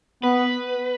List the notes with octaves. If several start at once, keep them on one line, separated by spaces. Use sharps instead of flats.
B3 B4